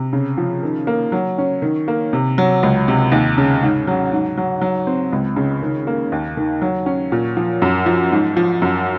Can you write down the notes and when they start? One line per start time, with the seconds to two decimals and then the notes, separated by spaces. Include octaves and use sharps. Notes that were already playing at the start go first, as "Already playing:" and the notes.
Already playing: C3
0.13 C#3
0.38 F3
0.63 D#3
0.87 A#3
1.12 F#3
1.38 C#4
1.62 D#3
1.88 A#3
2.13 C3
2.38 F#3
2.63 C#2
2.88 C3
3.12 D#2
3.38 C#3
3.63 G#2
3.87 F#3
4.12 G#2
4.38 F#3
4.62 F#3
4.87 C4
5.13 C#2
5.36 C#3
5.62 D#3
5.87 A#3
6.12 D#2
6.37 D#3
6.62 F#3
6.86 C#4
7.12 A#2
7.37 F3
7.62 F#2
7.86 F3
8.12 G#2
8.37 F3
8.62 F#2